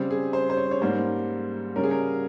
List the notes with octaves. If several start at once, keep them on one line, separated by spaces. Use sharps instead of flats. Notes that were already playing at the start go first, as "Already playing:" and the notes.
Already playing: C#3 G3 C4
G#4
C5
C5
C#5
C#5
G#2 G3 A#3 C#4 C5
C#3 G3 C#4 A#4
G#4
A#4